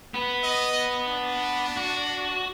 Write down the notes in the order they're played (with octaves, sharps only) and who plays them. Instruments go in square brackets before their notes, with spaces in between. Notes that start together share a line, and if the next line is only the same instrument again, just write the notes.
[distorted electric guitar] B3 B4
[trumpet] D#5
D4
[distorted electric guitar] F#4